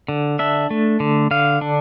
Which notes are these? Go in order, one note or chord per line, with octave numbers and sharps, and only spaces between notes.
D3
D4 E5
A3
D3
D3 F5
D4